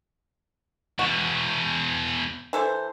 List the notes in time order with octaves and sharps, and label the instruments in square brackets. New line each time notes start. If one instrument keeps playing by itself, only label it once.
[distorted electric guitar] E2 B2 [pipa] F#4
[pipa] E3 A4 C5